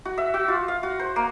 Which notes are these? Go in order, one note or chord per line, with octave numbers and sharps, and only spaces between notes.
F#4
E5
F#4
F4
F5
F#4
C5
A#3